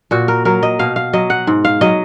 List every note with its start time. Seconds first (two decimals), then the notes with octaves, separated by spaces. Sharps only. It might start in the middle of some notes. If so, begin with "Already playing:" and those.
0.11 A#2 F#4
0.28 A#4
0.45 F#3 A#4
0.63 D#5
0.79 B2 F5
0.96 F5
1.13 F#3 D#5
1.30 F#5
1.47 G#2
1.65 F5
1.81 F#3 D#5